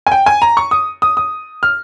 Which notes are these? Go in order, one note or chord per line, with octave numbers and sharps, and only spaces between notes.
G#5
G5
G#5
A#5
C#6
D#6
D#6
D#6
F6